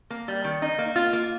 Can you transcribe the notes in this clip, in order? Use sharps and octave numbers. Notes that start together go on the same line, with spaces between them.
A#3
G3
D#3
D#4
A#3
F4
A#3